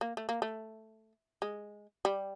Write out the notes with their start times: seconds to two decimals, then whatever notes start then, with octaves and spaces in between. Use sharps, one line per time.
0.01 A#3
0.17 A3
0.29 A#3
0.42 A3
1.42 G#3
2.05 G3